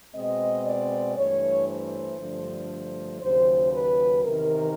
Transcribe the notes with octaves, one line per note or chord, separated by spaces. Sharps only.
B2 G#3 C4 D#5
D5
G2 E3 A3 C#5
C5
G2 D3 F3 A3
D#2 C#3 F#3 C5
B4
E2 C3 D#3 A#4